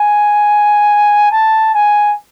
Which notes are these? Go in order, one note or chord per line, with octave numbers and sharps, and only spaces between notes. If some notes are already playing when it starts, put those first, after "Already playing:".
Already playing: G#5
A5
G#5